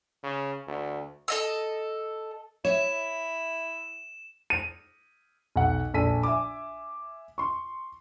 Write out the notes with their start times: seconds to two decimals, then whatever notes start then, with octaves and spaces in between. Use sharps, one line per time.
0.23 C#3
0.67 D2
1.28 A4 D#5 E6
2.65 E4 C#5 E5 E7
4.50 D#7
5.56 B1 F#5
5.94 A#1 A4 B6 D#7
6.23 E5 G#5 D6
7.38 C6 C#6